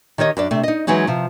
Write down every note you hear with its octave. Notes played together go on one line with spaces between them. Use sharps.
D#3 G4 C#5 D#5
F#2 D4 D5
C3 A3
D#4 D#5
E3 F#3 G#3 C#4 D#4
C3 F3